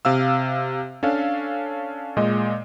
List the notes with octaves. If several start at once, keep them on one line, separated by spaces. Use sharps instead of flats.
C3 F5 E6
C#4 D4 A4 F5
A#2 G#3 D#5